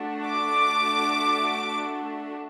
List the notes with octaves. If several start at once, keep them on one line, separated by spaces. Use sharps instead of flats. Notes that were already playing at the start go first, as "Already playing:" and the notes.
Already playing: A3 D4 F#4
D6